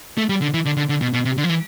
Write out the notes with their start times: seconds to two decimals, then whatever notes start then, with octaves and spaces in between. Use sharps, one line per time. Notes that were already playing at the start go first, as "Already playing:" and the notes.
0.18 A3
0.29 G3
0.42 D3
0.54 E3
0.66 D3
0.77 D3
0.89 D3
1.01 B2
1.13 B2
1.25 C3
1.37 D3
1.44 F3
1.49 E3